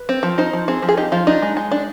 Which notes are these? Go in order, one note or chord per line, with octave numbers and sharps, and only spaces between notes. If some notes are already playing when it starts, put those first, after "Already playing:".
Already playing: B4
C4
F3
D#4 C5
F3
C4 G#4
F3
G#4
D#4 G4
F3 F4
D4 D#4
G#3
G#3 D#4
D4